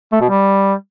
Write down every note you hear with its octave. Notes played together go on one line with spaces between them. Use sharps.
A3
B2
G3